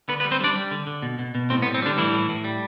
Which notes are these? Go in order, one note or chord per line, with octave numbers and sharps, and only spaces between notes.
D3 B3 B4
B3 B4
G3
C4 C5
G3 D4 D5
G3
D3
D3
B2
B2
B2
A2 C4
B3
G3
C4
D3 G3 D4
A2 E3 E4
A2
A2
G3